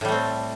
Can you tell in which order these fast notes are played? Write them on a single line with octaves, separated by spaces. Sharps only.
A2 G3 A3 C4